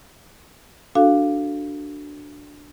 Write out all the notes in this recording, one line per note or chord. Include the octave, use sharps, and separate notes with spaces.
D4 F#4 A4 F5